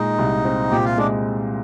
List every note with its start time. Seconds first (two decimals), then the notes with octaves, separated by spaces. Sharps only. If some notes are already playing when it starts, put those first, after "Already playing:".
Already playing: A#2 G#3 D#4
0.19 C2
0.45 C4
0.71 A#2 G4
0.84 F4
0.98 G#3 D4